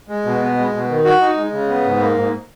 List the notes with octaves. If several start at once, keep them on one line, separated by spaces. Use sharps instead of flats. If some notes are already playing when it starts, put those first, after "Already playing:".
G#3
B2
B3
G#3
B2
D#3
F#4
D#4
G#3
C#3
B3
G#2
A#3
G#2